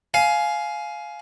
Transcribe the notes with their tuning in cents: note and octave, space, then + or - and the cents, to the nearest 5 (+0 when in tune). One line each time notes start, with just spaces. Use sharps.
F5 +0 G#5 +20